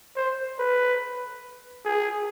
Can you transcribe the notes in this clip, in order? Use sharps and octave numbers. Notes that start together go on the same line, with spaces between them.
C5
B4
G#4